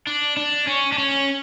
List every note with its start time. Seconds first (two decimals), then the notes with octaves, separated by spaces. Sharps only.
0.07 D4
0.37 D4
0.67 C#4
0.92 D4
0.98 C#4